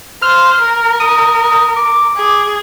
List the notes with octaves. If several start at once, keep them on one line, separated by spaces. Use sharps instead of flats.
C5 F6
A#4
D#6
D6
G#4